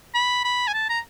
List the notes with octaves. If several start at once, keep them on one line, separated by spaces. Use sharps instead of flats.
B5
B5
G#5
A5
A#5